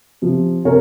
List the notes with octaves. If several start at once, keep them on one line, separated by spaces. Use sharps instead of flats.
C3 F3
C3 A#4 C#5